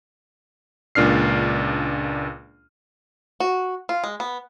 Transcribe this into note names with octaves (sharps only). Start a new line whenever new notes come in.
C#2 A#2 D4 F6 C7
F#4
F4
G#3
B3